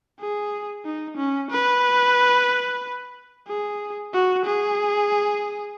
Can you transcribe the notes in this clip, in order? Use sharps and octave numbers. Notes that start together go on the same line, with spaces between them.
G#4
D#4
C#4
B4
G#4
F#4
G#4